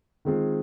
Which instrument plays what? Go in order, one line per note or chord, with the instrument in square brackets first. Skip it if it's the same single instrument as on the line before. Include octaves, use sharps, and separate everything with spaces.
[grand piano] D#3 G#3 C4 F4 G#4